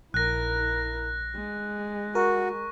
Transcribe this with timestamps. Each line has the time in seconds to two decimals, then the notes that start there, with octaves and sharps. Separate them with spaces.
0.14 A#1 E4 A#4 F#6 A#6
1.35 G#3
2.15 F#4 A#4 C#6